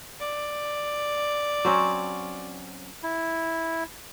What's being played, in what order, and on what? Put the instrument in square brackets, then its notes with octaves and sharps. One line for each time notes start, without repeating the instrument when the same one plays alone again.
[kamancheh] D5
[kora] F#3 C4 C#4
[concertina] E4